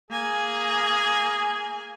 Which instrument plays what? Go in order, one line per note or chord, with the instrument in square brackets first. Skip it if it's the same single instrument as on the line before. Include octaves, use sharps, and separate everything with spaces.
[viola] A#3 G#5 [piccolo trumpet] G#4